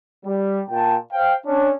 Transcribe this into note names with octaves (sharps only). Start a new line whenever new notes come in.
G3
A#2 G5 A5
C5 F5 G5
C#4 D4